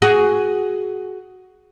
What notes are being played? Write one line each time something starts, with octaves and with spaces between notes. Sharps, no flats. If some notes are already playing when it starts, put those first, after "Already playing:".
F#4 G#4